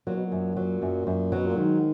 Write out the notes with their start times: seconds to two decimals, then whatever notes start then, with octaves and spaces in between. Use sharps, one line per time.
0.07 A#2 F#3
0.17 B2
0.27 A#2
0.32 F#2
0.57 F#3
0.82 F#2
1.07 F#2
1.32 B2 F#3
1.46 A#2
1.57 G#2 D#3